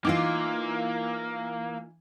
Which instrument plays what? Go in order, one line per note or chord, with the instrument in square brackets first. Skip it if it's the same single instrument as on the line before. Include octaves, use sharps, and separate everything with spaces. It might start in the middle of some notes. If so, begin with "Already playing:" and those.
[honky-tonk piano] E3 D6 [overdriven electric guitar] A#3 [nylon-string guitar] D#4 F4